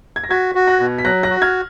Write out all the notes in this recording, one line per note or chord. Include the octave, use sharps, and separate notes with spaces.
G#6
A#6
F#4 G#6 B6
F#4
F#6 A#6
B2
B6
F#3 F#6 A#6
F#6 A#6
F#4
F6 G#6